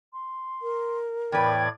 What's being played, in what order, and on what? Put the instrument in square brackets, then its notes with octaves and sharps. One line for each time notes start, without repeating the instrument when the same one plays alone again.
[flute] C6
[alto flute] A#4
[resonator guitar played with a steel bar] E2 B4 [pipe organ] A2 D5 G#6 [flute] G5